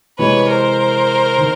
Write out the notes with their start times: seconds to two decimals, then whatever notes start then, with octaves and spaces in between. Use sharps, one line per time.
0.18 C3 E3 G#3 B4 C#5
0.48 A#4 C5
1.38 D#3